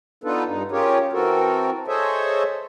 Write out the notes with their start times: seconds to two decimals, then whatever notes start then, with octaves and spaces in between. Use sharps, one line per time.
0.24 B3 D4 D#4 F4 A4 B4
0.47 G2 D#4
0.72 C#4 F4 G4 G#4 A#4 C#5
1.13 E3 C4 F#4 A4 A#4
1.88 G#4 A4 C5 C#5 D#5 E5